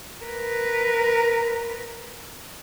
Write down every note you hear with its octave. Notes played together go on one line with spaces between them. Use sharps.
A#4 B4